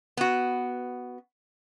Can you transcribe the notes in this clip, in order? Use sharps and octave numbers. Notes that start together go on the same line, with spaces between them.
B3 F#4